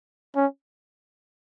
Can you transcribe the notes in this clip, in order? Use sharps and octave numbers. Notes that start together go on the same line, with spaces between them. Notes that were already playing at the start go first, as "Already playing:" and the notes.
C#4